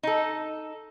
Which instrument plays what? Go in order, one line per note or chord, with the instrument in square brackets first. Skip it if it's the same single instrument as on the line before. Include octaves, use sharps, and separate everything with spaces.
[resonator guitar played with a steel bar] D#4 A4